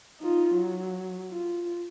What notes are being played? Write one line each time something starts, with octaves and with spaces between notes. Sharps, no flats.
D#4 F4
F#3
F4